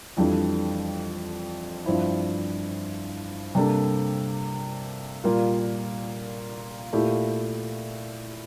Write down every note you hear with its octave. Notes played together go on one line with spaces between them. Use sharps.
F2 E3 G3 D4 A4
G2 F3 C4 E4
C3 G3 A#3 D4 A4
A#2 G3 A#3 F4
A#2 A3 E4 G4